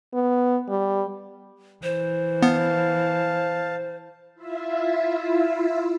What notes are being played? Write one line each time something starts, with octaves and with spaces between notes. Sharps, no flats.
B3
G3
E3 C5
B3 F5 A5
E4 F4 E5